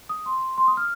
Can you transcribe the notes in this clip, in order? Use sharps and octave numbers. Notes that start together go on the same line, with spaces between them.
D#6
C6
C6
D#6
F6